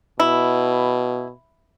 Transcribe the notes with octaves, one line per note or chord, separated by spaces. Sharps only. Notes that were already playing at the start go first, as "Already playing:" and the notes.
B2 E4